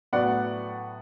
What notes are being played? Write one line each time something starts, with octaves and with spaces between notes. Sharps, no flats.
A2 F#3 B3 D5 F#5